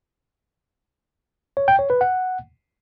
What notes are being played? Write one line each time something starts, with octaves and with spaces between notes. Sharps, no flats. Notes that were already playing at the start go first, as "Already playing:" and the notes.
C#5
G5
C#5
B4
F#5